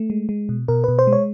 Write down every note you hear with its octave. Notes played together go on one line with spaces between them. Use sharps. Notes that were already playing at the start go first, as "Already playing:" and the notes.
Already playing: A3
G#3
G#3
B2
B2 A#4
B2 B4
C5
G#3
C#5